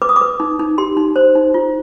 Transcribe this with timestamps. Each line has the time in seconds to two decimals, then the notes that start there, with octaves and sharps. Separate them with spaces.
0.02 B4 D6
0.09 D#6
0.16 D6
0.21 B4
0.40 D#4
0.59 D#4
0.78 G4 C6
0.97 D#4
1.16 C5
1.35 D#4
1.54 F4